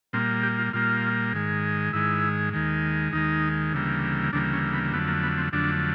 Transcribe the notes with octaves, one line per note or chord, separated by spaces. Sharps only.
A#2 G3 A#3 C4
G4
F4
A#2 G3 A#3 F4
G#2 D#3 G#3
G#2 D#3 G#3 E4
D#2 D#3 G#3
D#2 D#3 G#3 D#4
D2 C#3 E3 G3 A#3
D2 C#3 E3 G3 A#3 D4
C#4
B3
F2 D3 F#3 A3 B3
A#3
B3
C4
F2 D3 F#3 A3 D4